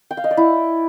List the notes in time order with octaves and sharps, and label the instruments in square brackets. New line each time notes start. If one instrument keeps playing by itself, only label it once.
[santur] G5
F5
D#5
D5
E4